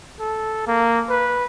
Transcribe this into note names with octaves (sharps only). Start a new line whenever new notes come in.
A4
A#3
B4